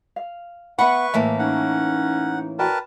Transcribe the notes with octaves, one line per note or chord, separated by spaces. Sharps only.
F5
B3 B4 E5 F#5 B5 C#6
A2 E3 A#3 A4 E5
C#4 D#4 F#5
F#4 A#4 B4 D5 G5 A5